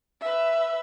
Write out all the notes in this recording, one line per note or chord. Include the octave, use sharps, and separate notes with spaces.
B4 E5